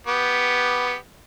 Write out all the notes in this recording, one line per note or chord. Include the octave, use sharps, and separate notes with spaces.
B3 G4